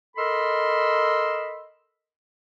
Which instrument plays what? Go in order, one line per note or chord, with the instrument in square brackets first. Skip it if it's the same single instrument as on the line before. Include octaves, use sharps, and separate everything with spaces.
[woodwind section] A4 A#4 D#5 B5 C6 E6